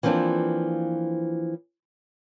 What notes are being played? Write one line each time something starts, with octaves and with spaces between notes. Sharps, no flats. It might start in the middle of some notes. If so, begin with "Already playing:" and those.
E3 F3 A#3 C4 D4 F4